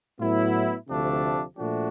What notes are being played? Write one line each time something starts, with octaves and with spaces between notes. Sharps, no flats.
A2 F#3 B3 E4
D2 C3 F3 A3 D4
A#2 F3 A3 D4 F#4